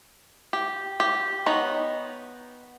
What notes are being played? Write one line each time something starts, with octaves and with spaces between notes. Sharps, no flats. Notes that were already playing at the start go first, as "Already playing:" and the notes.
G4
G4
B3 D#4 C#5 D#5